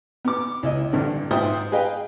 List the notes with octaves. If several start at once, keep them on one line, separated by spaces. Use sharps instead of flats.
B3 D6
C#2 E4 D#5
A1 G2 D3 C4
G#2 F4 C5 E5 G5 D#6
G#4 B4 D#5 F5 G5